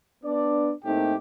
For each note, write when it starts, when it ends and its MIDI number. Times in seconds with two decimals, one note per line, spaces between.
0.24 0.71 59
0.24 0.71 62
0.24 0.71 74
0.84 1.14 45
0.84 1.14 57
0.84 1.14 58
0.84 1.14 60
0.84 1.14 63
0.84 1.14 67